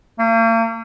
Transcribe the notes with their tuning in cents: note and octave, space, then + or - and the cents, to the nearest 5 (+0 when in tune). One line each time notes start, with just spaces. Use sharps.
A#3 -40